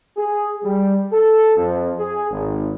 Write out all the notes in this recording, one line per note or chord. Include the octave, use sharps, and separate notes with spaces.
G#4
G3
A4
F2
G#4
G#1